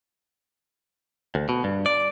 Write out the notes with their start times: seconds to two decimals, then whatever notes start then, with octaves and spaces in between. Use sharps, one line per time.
1.35 D2
1.49 B2
1.64 G2
1.86 D5